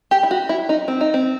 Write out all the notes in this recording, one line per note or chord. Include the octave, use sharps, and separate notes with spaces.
G4
E4
F#4
E4
D#4
C4
D#4
C4